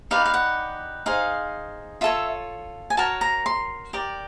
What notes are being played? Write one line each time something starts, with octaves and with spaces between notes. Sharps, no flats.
D#4 G4 B4 D5 F5
F5
F#5
D#4 G#4 C5 F5
F4 A4 C#5 E5
G#5
F#4 A#4 C#5 A5
A#5
C6
G4 A#4 D5